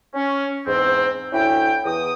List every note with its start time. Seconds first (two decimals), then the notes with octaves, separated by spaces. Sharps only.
0.14 C#4
0.66 E2 G#2 C4
1.33 D2 C#4 E4 G5
1.85 E2 D#6